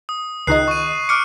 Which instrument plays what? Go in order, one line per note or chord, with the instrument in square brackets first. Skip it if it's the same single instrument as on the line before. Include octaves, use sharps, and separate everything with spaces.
[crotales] D#6
[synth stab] C#2 D#3 D#5 [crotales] F#6 C7
[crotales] C#6 D#7
[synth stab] D6 [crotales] F6 C#7